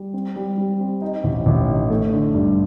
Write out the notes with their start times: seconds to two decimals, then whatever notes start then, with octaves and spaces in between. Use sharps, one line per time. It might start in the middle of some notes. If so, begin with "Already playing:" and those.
Already playing: G3
0.13 C4
0.36 G3
0.58 G3
0.80 C4
1.02 D#4
1.24 A1
1.46 A1
1.68 D#4
1.90 A3
2.12 D3
2.34 G2